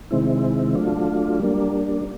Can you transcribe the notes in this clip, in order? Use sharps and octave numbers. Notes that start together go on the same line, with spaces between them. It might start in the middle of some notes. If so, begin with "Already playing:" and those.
C3 D#3 G#3 C4 E4
F#3 A3 D4 F4
G3 A#3 D4